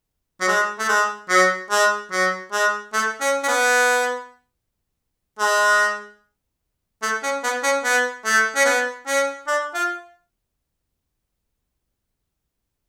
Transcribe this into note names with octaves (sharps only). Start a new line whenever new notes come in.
F#3
G#3
A3
G#3
F#3
G#3
F#3
G#3
A3
C#4
C#4
B3
G#3
A3
C#4
B3
C#4
B3
A3
C#4
B3
C#4
D4
F4